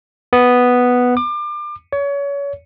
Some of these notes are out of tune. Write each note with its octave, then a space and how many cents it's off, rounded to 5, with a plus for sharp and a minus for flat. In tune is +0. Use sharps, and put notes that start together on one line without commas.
B3 +0
D6 +30
C#5 +30